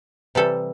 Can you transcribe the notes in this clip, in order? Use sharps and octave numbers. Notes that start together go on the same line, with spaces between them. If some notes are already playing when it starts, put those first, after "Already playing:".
C3 E3 G3 A4